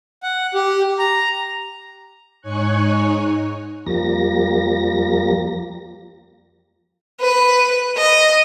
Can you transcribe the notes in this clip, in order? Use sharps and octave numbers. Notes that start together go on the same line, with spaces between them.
F#5
G4
A#5
G#2 D#4 C#5 G#5 C#6 F#6
F2 F3 G3 A#3 A#6
B4
D#5